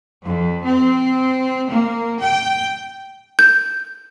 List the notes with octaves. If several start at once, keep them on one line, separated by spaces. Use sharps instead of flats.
F2
C4
A#3
G5
G6